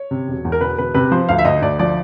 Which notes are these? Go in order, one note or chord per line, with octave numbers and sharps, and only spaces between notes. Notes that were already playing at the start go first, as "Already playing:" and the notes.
Already playing: C#5
C3
E1
E2
A#4
E1 B4
E1 B4
C3 B4
F3 C5
D2 F5
E5
D2 D#5
D2 D5
F3 D5